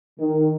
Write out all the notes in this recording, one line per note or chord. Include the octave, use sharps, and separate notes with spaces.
D#3